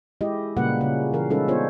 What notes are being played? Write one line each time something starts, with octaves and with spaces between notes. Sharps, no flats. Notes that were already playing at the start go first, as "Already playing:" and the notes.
G#3 E4 G4 D#5
A#2 C#3 G3 A#3 B4 F#5
C#3 C#4
E3 A#4 F5
G3 G#3 C#4 D#4 A4 B4
B3 D4 F4 C5 C#5